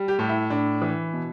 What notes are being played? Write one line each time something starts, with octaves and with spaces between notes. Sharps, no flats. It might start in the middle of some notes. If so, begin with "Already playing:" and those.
Already playing: G3
G4
A2 G4
E4
A2 D4
E3
B2